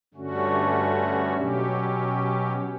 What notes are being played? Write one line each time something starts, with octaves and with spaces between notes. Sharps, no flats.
G2 D3 A3 C#4 F#4
B2 F#3 C#4 G4